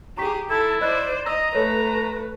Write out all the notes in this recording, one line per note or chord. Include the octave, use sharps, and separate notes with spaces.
G4 G#4 A#5 C#6 B6
E4 A4 A5
C5 D5 D#5 B5 F#6
D#5 A#5 E6
A3 A4 B4 C#5